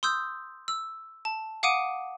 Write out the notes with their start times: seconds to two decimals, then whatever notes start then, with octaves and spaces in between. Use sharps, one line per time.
0.03 C6 D#6 E6 G6
0.68 E6
1.25 A5
1.63 F5 F#5 D6 D#6 D7 D#7